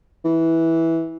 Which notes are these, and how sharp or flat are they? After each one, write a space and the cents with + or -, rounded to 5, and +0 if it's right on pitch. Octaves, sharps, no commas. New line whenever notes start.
E3 -10